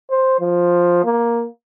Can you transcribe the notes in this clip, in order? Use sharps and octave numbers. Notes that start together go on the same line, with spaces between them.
C5
F3
A#3